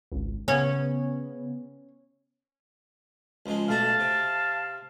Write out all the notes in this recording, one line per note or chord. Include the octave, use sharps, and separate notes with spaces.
G#1 C#2
C#3 B3 C#4
C#2 F3 G#3
B1 A3 F#4 F5 A5
C3